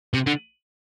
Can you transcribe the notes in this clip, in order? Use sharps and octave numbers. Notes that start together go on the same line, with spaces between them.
C3
D3